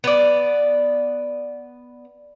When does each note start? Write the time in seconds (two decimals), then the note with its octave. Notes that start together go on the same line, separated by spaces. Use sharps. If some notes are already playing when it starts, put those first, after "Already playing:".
0.04 B3 D5